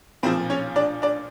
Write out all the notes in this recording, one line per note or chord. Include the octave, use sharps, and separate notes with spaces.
B1 A#2 F3 C4 C5
C#4 C#5
D4 D5
D4 D5